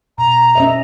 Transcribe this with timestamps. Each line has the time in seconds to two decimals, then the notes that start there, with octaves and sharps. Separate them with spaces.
0.18 B2 A#5
0.55 C#4 D#5 E5